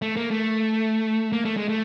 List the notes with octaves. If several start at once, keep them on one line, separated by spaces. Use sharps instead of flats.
A3
A#3
A3
A#3
A3
G#3
A3